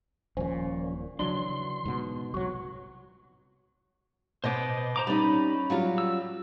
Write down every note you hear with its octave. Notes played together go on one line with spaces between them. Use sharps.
D#1 A#2 F3 C#4
C#3 E3 F#3 D4 C6
G#2 B2
C2 F#3 F#4
B2 B3 C5 D#5 D6
C5 A#5 D6
G3 C#4 D#4 B5
F#3 G3 F4
E6